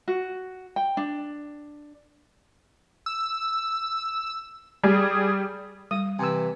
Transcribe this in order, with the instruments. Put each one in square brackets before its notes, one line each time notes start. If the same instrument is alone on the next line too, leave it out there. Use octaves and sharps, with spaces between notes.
[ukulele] F#4
G5
D4
[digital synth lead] E6
[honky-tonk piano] G3 [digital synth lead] G#4
[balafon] G3 [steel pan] D#6
[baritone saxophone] C3 [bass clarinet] E3 [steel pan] G#5 E6